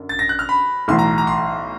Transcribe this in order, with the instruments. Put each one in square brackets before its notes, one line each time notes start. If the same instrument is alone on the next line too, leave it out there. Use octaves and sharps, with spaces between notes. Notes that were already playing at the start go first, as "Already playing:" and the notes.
Already playing: [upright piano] F#2 D3
[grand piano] A6
A#6
F#6
F6
B5
[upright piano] B1 A2 E3 [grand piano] C6
[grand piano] A#5
A#5
C6